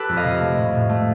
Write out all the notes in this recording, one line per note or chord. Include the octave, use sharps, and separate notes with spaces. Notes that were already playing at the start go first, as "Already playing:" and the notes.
Already playing: G4 A4 B4
F2
D#5 F5
C3
A3
A2
A2
A3